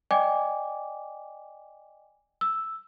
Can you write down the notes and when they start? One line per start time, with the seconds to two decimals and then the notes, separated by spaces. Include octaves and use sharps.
0.11 D5 D#5 G5 G#5 D6
2.41 E6